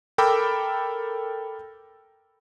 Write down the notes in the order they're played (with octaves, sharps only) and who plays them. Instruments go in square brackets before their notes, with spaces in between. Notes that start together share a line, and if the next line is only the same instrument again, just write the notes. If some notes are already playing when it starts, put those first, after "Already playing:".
[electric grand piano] A4 A#4 G5 B5 D6 E6